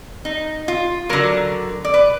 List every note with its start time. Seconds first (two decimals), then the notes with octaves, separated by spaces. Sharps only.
0.25 D#4
0.68 F4
1.09 D3 F#3 A#4
1.85 D5
1.94 B4